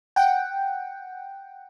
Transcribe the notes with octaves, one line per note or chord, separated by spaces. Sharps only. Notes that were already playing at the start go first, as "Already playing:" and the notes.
F#5 G5